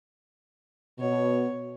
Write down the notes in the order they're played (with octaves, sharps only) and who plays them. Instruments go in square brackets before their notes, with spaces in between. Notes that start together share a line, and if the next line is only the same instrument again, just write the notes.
[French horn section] B2 [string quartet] C#5